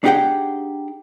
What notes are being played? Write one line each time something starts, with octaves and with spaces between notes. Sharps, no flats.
D4 D#4 G4 G#4 F#5 G5